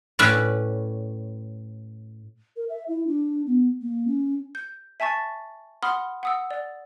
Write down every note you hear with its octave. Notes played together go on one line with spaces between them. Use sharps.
A2 C#4 B4 D5
A#4
E5
E4
D4
B3
A#3
C#4
G6
E5 G#5 A5 C#6 A6
F#5 B5 C6 D#6 F6 G7
F#5 D#6 E6
D5